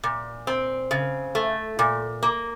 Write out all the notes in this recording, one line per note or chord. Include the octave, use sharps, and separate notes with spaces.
A#2
C4
C#3
A3
A#2
A#3